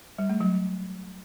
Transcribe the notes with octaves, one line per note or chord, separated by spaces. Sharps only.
G3
A3
F#3